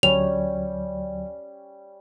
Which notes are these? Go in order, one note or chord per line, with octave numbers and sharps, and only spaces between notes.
D2 F#3 G3 C#4 C#5 F7